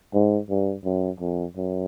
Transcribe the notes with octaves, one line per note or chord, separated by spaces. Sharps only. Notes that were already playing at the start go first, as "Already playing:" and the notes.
G#2
G2
F#2
F2
F#2